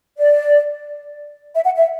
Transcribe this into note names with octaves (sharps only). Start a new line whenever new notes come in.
D5
E5
F#5
E5